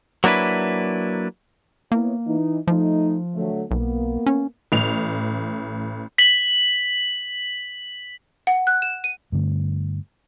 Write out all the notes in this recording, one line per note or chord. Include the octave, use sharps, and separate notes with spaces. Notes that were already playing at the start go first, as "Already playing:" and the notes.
F#3 A#3 D4 E4 B4
A#3 B3 E4 C#5
E3 D#4
F3 A3 D#4
D3 F#3 A3
B1 A#3 B3
C#4
A1 F7
B6 F#7
F#5
F#6
E7
D#7
G2 D3 A3